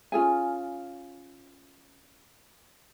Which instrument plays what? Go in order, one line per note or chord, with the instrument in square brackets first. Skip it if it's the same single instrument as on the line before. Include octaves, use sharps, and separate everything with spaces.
[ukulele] C#4 F4 G#4 G#5